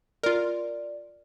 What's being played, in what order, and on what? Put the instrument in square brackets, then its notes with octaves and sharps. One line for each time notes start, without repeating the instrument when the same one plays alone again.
[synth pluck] F4 A#4 [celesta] D5